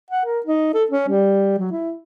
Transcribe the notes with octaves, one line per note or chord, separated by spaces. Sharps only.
F#5
A#4
D#4
A4
C#4
G3
F#3
E4